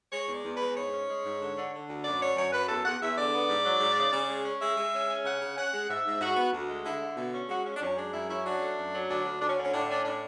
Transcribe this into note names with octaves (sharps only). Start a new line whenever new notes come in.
G#3 C#5
E2
D5
E2
B4
G#3
G#2 C#5
C#4
G#3
G#2
D3
D3
D3
D2
F#2 D5
D3 C#5
F#2 C#5
F#2 B4
E2 A4
E2 F#5
E2 E5
D3 D5
B3
G#2
F#3
G#2
C#3
C#3
G#3
C#4
G#3 E5
G#3
C#4
C#4
C#3 F#5
C#3
C#4 F#5
G#3
G#2 E5
G#2
G#2 F#4
B3
D2
G#3
D3 E4
D3
B2 E4
C#4
G#3 F#4
C#4
D4
F#2 C#4
G#3 D4
F#2 E4
C#4 E4
F#3 D4
A3
F#2
F#3
D2 D4
D2
D2 D4
C#4
D3
C#4
A2 D4
C#4 D4
A2 D4